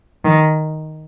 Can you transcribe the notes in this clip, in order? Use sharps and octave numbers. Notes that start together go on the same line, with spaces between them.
D#3